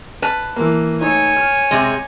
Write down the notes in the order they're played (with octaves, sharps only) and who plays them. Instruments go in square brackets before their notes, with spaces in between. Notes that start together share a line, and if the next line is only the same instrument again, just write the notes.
[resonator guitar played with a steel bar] B4 A5
[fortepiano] E3 A#3
[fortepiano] A3 D#4 [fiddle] C#5 G#5
[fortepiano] F6
[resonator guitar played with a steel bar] C3 G#3